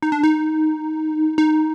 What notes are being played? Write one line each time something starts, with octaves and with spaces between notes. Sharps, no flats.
D#4
D4
D#4
D#4